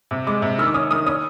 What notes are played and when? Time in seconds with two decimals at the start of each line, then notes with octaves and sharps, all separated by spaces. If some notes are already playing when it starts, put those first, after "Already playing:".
0.11 C3
0.27 G#3 D6
0.42 C3
0.59 D#3 E6
0.67 D6
0.74 C#4 D#6
0.91 D#3 D#6
1.06 C#4 D#6